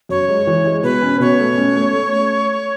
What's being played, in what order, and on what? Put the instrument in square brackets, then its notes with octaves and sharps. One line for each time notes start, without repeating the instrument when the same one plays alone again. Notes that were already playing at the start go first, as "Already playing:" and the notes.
[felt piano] F#2 [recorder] C#5
[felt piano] G#3
E3
G#3
[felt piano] B2 [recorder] B4
[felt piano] C#4
[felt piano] B2 [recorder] C#5
[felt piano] A3
C#4
A3
A3